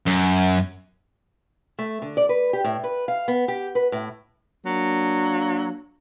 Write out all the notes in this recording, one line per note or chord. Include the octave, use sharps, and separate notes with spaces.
F#2
A3
D3
D5
B4
G4
A2
B4
F5
B3
G4
B4
A2
F#3 A#3 D4